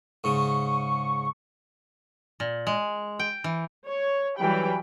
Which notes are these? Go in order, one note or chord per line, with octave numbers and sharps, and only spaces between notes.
G#2 C#3 C#6
A#2
G#3
G5
E3
C#5
E3 F#3 G3 G5 B5